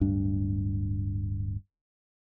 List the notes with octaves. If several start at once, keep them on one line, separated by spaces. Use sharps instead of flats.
D1 G2 D4